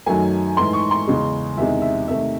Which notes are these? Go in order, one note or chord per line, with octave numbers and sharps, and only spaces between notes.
F#2 D#3 F#3 A3 G#5
G#2 E3 A3 C6
C#6
C6
E2 C#3 G#3
E2 C3 D#3 G#3 E5
E5
C3 D#3 A3 E5